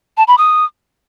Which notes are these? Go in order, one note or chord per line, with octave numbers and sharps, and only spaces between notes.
A5
B5
D#6